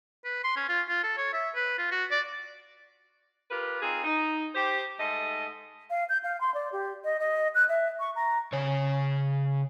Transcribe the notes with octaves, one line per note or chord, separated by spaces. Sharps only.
B4
C6
C#4
F4
F4
A4
C#5
E5
B4
F4
F#4
D5
F4 G4 A#4 B4
C4 D#4 F4 G#4
D#4
G4 C5
G#2 A3 D#5
F5
G6
F5
C6
D5
G4
D#5
D#5
F#6
E5
C#6
A#5
C#3 C#5